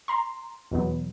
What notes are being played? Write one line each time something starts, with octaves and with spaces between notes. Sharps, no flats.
A#5 C6
E2 B2 F#3 B3